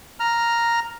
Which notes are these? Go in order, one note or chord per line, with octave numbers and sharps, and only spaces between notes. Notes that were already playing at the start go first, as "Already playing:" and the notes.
A#5 F6